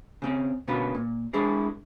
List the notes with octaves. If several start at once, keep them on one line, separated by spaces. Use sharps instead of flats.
C#3 C4 C#4
B2 D3 C#4 F4 A#4 B4
A#2
G#3 D4 E4 G#4 A#4